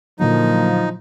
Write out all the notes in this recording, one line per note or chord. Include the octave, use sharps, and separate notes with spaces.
A#2 D3 F3 F#3 A#3 D#4